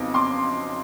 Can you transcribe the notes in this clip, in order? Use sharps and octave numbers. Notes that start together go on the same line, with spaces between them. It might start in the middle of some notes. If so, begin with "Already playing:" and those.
Already playing: F2 C#3 F#3 B3 D#4 D6
C6 D6